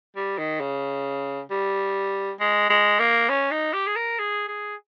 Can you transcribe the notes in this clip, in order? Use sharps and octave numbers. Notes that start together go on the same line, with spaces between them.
G3
D#3
C#3
G3
G#3
G#3
A#3
C#4
D#4
G4
G#4
A#4
G#4
G#4